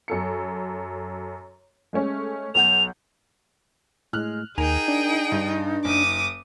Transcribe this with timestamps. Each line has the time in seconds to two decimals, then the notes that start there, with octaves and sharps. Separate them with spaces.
0.08 F#2 A4 C#7
1.93 G#3 A3 C#4
2.55 B1 F#5 G6 F7
4.13 A2 G#3 F6 F#6
4.58 D#2 D#4 G#4 A#4 G5 G#5 F7
4.88 D4
5.32 G2
5.85 F#1 D6 D#6